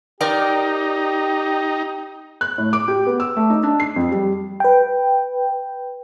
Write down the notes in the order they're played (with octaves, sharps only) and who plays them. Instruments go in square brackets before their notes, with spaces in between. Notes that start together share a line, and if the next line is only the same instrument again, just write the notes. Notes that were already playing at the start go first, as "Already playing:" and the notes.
[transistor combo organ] D#4 [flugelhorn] G4 [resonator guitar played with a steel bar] A#4 D5 G5
[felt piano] F#6
A2
D6
G4
B3
E6
A3
D#4
D4
C7
F2
G3
[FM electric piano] B4 G5